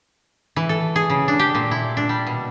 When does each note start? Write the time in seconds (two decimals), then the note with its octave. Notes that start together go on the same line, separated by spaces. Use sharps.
0.56 E3
0.69 A4
0.96 G#4
1.10 C#3
1.28 D4
1.39 G4
1.55 A#2
1.71 E4
1.97 D4
2.09 G3
2.27 B2